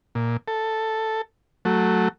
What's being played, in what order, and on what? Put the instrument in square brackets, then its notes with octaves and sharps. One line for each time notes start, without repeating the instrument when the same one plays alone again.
[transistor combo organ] A#2
A4
F#3 A3